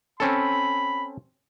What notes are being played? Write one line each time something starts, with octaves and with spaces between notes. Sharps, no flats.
C4 C#4 A4 B5